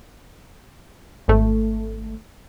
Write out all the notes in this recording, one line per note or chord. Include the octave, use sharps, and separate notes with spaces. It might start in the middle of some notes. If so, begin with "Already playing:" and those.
G#1 A3